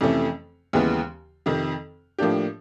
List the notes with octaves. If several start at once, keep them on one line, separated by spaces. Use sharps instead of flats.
F2 C3 E3 A3 C#4
D#2 C#3 E3 G#3 B3
F2 C3 D#3
A2 F3 A#3 D4 G4